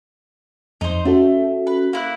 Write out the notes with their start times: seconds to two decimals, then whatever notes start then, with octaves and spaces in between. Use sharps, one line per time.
0.81 F2 D#4 C5
1.05 A3 C#4 F#4 A4
1.67 B4
1.93 A#3 E4 F#6